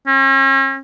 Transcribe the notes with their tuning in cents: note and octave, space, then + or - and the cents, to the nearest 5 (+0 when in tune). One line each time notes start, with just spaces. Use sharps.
C#4 -40